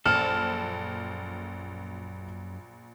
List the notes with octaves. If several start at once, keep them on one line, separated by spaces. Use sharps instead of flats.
A#1 F#2 A4 F6